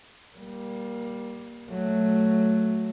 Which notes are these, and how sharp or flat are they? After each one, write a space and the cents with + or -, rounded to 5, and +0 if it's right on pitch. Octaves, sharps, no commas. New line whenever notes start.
G3 +0 A#3 +20
F#3 +0 A3 +0